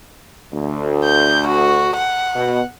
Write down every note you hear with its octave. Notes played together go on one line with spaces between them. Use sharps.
D2
G6
F#4
F#5
B2